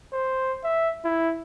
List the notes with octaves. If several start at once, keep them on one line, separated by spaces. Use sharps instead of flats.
C5
E5
E4